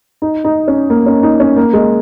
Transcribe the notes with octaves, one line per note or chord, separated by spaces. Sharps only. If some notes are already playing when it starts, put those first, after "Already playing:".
D#4
D#4
C#4
A#3
C#4
D#4
C#4
A#3
G#3